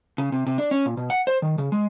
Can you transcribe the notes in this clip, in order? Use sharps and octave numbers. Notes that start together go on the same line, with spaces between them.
C#3
C3
C3
D4
C#4
A#2
B2
F#5
C5
D#3
C#3
G#3